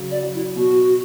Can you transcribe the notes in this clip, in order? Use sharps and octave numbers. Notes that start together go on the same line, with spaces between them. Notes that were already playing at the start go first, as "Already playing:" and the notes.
Already playing: C#3 F#3
D5
F#3
E4
B2 F#4